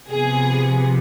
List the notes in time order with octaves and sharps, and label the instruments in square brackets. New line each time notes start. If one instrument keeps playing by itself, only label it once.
[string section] C3 F3 B3 G#4